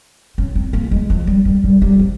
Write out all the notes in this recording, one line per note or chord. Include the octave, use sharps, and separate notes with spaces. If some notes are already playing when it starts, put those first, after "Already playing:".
C#4
C4
A#3
G#3
F3
G3
G3
G3
G3
F3